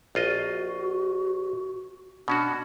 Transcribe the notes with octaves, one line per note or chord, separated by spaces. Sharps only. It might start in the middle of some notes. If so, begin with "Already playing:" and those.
A#1 F4 F#4 D#5
B2 C#4 D4 F#4